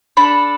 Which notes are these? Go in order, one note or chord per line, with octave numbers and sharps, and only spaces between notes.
D4 A4 B5